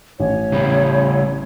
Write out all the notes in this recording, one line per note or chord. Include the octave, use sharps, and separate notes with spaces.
A1 C#5
C#3 G3